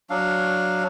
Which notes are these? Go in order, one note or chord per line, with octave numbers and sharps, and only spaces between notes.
F#3 D4 F5